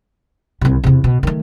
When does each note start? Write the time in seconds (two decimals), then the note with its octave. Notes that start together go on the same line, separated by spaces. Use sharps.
0.61 C2 C3
0.84 E2 C3
1.04 B2
1.23 D#3 A3